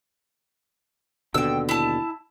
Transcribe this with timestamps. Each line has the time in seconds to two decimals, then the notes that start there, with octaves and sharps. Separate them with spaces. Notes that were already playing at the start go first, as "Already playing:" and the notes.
1.34 D#2 B2 D3 G5 E6
1.69 E4 A5